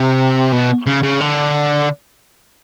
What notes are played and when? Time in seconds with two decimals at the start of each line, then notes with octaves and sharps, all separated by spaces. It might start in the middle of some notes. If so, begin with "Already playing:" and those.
Already playing: C3
0.52 B2
0.87 C#3
1.03 C#3
1.21 D3